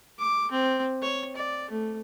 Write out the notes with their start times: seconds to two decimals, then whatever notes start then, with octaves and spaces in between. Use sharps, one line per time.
0.19 D6
0.51 C4
1.02 C#5
1.36 D5
1.70 A3